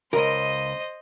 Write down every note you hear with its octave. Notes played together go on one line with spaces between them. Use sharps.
C#2 A#4 C5 D#5